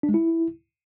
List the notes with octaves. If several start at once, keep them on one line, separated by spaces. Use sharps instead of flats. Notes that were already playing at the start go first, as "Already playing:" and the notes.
D4
G#3
E4